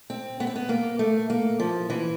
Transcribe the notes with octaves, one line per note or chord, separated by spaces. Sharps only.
C4
B3
C4
B3
A#3
A3
A#3
F3
E3